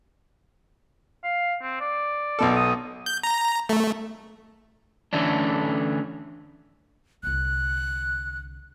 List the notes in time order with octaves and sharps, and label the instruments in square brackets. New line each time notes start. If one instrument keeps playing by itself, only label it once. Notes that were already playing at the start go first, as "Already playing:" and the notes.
[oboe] F5
C4
D5
[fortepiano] B1 B2 A4
[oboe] D#6
[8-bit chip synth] G6
A#5
A3
[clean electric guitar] D3 E3 A3 C#4 D4
[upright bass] C2 D3 [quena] F#6